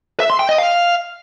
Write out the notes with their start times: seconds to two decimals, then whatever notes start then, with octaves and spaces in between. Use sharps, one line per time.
0.20 E5
0.30 C6
0.39 G5
0.49 D#5
0.58 F5